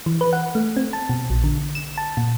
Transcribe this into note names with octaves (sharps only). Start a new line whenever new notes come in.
E3
B4
F#5
A3
C4
A5
B2
A#1
D3
E7
A5
A#2